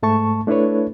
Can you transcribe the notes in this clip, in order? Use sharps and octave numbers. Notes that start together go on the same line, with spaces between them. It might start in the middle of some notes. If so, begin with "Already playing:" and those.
G#2 A3 A5 C#6
A3 D4 E4 A4 B4 C#5